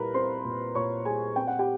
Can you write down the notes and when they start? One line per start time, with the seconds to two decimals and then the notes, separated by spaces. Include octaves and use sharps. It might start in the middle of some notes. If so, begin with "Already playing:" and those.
Already playing: A#2 G3 E4 A#4 B4 A#5 B5
0.14 C4 C5 C6
0.44 A#2
0.75 A#2 C#5 C#6
1.05 G3 G#4 G#5
1.36 C4 G5
1.47 F#5
1.59 G4 G5